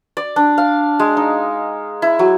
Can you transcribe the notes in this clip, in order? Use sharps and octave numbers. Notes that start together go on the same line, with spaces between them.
D5
D4
F5
G#3
D#4
E4
F#3